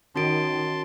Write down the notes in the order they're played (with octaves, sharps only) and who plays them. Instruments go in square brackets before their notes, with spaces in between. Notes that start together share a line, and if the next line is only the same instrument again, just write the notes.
[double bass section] D#3 [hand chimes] C#4 F#4 D7 [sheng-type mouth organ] A5 C6